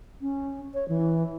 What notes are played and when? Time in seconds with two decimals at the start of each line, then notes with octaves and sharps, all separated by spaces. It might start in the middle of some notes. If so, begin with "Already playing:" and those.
0.21 C#4
0.74 C#5
0.88 E3